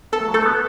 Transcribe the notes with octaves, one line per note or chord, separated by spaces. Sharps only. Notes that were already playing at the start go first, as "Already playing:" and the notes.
B3 A4
A3
F#3
A3 A4
B3